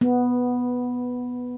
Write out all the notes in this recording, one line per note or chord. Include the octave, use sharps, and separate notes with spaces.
B3